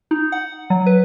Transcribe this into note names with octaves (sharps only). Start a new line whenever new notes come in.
D#4
F#5
F#3
B4